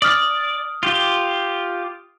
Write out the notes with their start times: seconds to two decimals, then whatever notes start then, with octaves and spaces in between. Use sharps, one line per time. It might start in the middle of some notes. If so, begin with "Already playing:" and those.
0.02 D5 D#6 F6
0.83 F4 G4